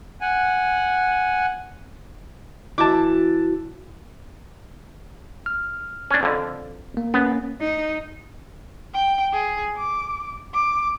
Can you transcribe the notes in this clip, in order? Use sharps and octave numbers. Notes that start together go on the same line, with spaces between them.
F#5 G#5
E3 E4 F#4 A5 D6
F6
C#4 D4
F2 D3
A#3
A#3 B3 C#4
D#4
G5
G#4
D6
D6